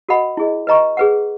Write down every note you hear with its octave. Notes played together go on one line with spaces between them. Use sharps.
F#4 A#4 D#5 F#5 B5
E4 G#4 D#5
B4 D#5 A#5 C#6
G#4 B4 F#5